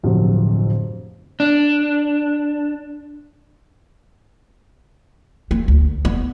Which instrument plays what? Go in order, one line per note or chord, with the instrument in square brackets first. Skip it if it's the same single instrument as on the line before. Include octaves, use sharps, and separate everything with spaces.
[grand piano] D1 G1 F2 C3 F#3
[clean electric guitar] D4
[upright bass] A#3
D2
B3